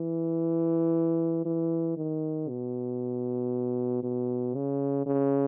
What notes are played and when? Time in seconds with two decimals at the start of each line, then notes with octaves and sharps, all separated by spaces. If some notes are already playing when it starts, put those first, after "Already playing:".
Already playing: E3
1.45 E3
1.97 D#3
2.49 B2
4.03 B2
4.55 C#3
5.06 C#3